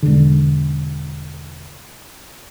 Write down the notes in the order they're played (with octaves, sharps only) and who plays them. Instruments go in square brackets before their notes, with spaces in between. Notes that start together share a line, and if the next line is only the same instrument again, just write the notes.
[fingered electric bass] E1 D3